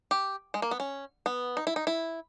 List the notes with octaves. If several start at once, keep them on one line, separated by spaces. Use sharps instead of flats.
G4
G#3
A#3
B3
C#4
B3
D#4
E4
D#4
E4